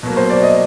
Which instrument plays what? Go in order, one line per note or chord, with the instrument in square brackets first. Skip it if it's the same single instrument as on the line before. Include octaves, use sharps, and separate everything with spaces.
[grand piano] B2 F#3 A#3
[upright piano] C5
D5
D#5